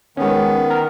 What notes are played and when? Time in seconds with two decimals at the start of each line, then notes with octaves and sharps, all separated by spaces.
0.17 D#3 G#3 B3 C#4
0.70 A#5 F6